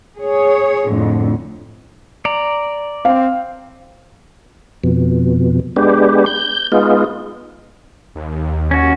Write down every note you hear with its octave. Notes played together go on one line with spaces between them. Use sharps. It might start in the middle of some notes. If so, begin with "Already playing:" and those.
G#4 C#5
F2 A2 D3
D5 A#5
C4 F5
F2 B2
G#3 B3 D4 G4
G6
G#3 B3 D#4 F4
D#2
C#4 F#4